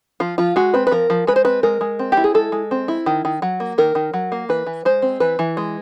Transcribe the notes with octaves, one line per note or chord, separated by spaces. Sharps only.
F3 F4
F3 F4
G#3 F#4
C4 B4
B4
F3 A#4
F3
G#3 B4
C5
C4 B4
G#3 A#4
G#3
C4
G4
E4
G#4
G#3 A4
G#3
C4
E4
D#3
D#3
F#3
A#3
D#3 A#4
D#3
F#3
A#3
E3 B4
E3
G#3 C5
C4
E3 B4
E3
G#3